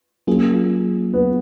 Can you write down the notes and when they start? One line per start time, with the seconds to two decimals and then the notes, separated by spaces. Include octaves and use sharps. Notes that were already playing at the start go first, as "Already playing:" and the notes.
0.27 F#3 A#3 C#4 F4 G#4
1.13 B3